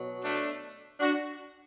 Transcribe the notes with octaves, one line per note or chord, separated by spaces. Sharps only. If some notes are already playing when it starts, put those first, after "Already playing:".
Already playing: B2 F#3
A3 D4
D4 F#4